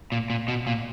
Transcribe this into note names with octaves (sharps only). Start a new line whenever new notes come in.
A#2
A#2
B2
A#2